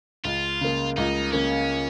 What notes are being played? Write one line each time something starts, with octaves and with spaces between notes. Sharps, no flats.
C#2 F4
C#3 A#3
C#2 D#4
C#3 A#3 C#4